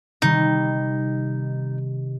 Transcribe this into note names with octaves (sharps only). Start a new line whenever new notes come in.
C3 D#3 G3 D#4